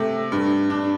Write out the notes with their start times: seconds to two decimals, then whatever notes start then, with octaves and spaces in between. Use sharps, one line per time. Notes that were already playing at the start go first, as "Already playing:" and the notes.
Already playing: C3 A3
0.32 G2
0.70 D4